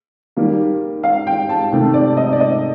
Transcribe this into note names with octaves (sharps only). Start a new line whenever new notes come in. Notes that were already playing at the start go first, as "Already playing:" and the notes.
D#3 G3 A#3
F5
G5
A5
C3 D#3 A3
D5
D#5
D5
D#5